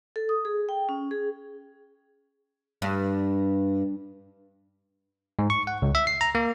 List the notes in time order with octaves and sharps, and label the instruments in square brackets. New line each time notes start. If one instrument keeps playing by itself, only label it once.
[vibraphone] A4
D#6
G#4
G5
C#4
G#4
[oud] G2
[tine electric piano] G#2
C#6
F#5
C#2
E5
C7
A#5
A#3